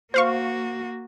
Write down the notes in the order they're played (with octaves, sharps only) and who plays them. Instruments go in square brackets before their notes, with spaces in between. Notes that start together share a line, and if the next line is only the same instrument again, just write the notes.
[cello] A#3 F#4 [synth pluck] C5 F5 C#6